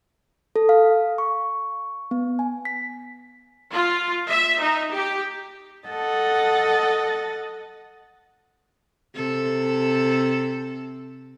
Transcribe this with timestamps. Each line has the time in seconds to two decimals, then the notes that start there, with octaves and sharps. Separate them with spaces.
0.56 A4
0.69 F5
1.18 C#6
2.11 B3
2.39 G#5
2.65 B6
3.73 F4
4.27 E5
4.59 D#4
4.93 G4
5.89 A4 D#5 F#5 A6
9.16 C3 A4